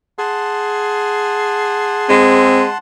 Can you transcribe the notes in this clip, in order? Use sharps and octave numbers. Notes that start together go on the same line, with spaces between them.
G#4 F#5 A5 C6
G#3 C4